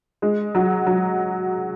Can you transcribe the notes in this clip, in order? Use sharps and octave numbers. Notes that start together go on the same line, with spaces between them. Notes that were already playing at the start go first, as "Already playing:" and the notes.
G#3
F#3
F#3